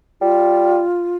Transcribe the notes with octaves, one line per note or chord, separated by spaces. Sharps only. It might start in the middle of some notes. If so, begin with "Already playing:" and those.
G3 F4